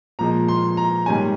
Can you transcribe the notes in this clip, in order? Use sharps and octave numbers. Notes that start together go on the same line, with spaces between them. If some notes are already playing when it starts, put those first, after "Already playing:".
A#2 F3 G#3 A#5
C6
A#5
G#2 D#3 G3 C#4 G#5